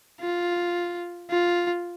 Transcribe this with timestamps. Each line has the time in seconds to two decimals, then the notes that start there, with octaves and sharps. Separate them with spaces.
0.21 F4
1.30 F4